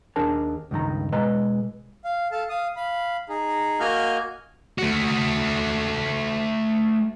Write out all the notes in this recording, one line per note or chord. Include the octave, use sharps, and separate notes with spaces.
D#2 D4 G#4 A#4 A5
C#2 G2 D#3 A#5
B2 G#3 B4 D#5 A#5
F5
A4 F5 A5
F5 D#6
F5 B5
D#4 G#4
A#3 F#4 D#5 G#5 F6 G6
A3 F#4